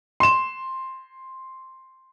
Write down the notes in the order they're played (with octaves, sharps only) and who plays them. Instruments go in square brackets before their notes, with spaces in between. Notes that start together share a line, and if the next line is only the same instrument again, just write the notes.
[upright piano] C6 E7